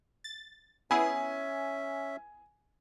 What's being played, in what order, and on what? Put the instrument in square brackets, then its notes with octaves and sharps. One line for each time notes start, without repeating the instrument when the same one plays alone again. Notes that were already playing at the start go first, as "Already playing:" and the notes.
[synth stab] A6
[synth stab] B3 E4 G#4 [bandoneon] C#4 E5 [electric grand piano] G#5